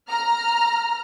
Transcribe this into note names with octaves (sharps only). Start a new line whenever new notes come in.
A#5 F6